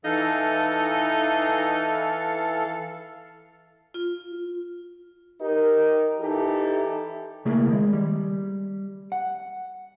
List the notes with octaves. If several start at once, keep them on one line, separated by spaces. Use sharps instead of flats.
E3 D#4 A4 F5
F4
D#4 G4 A#4
E3 D#4 E4 G4 A4
C#3 A3 A#3 E4 G#4 A#4
D#3 G#3
G3
F#5